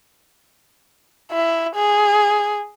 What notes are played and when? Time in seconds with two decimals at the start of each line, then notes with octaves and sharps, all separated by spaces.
1.32 E4
1.75 G#4